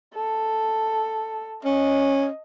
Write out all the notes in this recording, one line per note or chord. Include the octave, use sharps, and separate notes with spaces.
A4
C#4 D#5